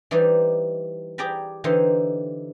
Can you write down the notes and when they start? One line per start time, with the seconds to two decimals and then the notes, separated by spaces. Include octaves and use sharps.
0.11 E3 G3 D#4 C5 D5
1.18 G4 G#4 D5 G5 A#5 B5
1.64 D3 E3 D#4 G4 C5